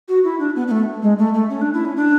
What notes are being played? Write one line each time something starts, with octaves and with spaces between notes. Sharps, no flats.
F#4
E4
D4
B3
B3
A3
G#3
A3
A3
C#4
D4
E4
C#4
D4